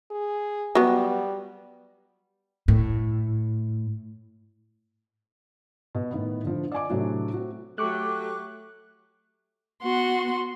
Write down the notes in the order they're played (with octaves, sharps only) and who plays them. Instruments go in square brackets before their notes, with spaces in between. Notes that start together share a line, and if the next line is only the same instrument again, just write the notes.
[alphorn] G#4
[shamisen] F#3 B3 [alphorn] G3
[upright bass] A2
[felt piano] B2
A2 D#3 B3
D3 F3
D5 D#5 G#5 D6
A2 C3 F#3 A3 D4 F#4
C4 F#4
[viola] F#3 G4 [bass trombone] A3 [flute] A4 [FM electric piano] C#6 D6 F#6
[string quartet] B3 F#4 C6